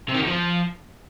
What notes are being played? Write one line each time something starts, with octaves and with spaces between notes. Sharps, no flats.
C3
D#3
E2
F3